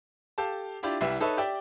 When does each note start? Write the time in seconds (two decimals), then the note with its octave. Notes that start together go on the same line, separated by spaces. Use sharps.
0.38 G4 A4 F5 A5
0.83 D4 E4 F4 G4 D5
1.01 C2 G3 E4 B4 E5
1.20 D#4 A4 B4 C#5 E5
1.37 G4 D5 E5 G5